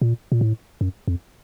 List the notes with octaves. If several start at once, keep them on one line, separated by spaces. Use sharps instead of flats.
A#2
A#2
A2
F#2
F2